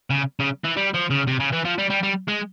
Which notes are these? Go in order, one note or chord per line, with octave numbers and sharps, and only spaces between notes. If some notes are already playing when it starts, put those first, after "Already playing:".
C#3
C#3
E3
G3
F3
C#3
C3
C#3
E3
F3
G3
G3
G3
G#3